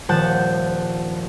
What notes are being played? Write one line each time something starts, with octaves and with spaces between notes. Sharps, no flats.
D#1 F3 F#5 A5 G6